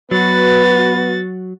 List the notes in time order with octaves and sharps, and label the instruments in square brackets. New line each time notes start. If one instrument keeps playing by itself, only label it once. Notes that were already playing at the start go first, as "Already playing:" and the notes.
[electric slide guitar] F#3 [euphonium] B3 [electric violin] F#4 A6 [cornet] B4